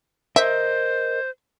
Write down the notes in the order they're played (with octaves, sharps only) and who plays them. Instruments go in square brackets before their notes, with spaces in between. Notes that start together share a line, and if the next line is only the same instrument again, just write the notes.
[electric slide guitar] A#4 D#5 [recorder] C5 [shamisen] E5